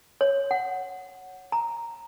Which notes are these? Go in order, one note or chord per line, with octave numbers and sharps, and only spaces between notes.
C#5
F#5
A#5